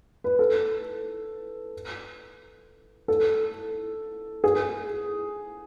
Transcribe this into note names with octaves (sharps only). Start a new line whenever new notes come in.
B4
A4
A4
G#4